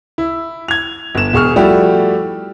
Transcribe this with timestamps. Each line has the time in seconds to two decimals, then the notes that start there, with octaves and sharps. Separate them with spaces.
0.18 E4
0.68 G#6 F7
1.15 G1 E7
1.33 E1 G#4 C#6 F6
1.56 F3 G3 A3 E4 F#4 G4